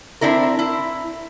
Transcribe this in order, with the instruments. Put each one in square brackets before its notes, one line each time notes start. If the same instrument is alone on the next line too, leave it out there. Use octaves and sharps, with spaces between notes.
[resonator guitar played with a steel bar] C4 D4 E4 A#4
E4